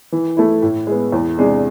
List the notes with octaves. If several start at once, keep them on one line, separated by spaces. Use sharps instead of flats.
E3
A3 E4
A2
G#3 B3
E2
C3 G#3 D4